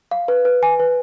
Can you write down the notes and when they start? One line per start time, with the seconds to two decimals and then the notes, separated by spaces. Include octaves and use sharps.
0.11 F5
0.28 B4
0.45 B4
0.63 G#5
0.80 B4